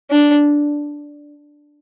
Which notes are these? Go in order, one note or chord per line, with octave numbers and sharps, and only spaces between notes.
D4